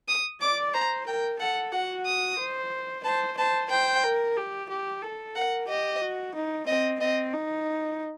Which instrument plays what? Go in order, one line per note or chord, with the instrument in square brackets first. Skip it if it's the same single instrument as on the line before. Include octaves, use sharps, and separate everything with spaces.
[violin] D#6
[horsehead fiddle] D5 [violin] D6
[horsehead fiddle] C5 [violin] A#5
[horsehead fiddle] A#4 [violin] G5
[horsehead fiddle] A4 [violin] F#5
[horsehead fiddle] F#4 [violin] F#5
[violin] D#6
[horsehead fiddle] C5
[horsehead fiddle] C5 [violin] A5
[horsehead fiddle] C5 [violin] A5
[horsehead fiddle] C5 [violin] G5
[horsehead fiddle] A#4
G4
G4
A4
[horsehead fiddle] A#4 [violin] F#5
[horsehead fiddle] G4 [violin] D#5
[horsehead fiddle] F#4
D#4
[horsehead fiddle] C4 [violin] D#5
[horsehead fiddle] C4 [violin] D#5
[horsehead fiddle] D#4